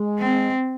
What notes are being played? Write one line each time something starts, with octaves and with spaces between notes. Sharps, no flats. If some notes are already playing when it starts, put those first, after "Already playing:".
Already playing: G#3
C4